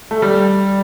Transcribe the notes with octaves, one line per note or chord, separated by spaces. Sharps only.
A3
G3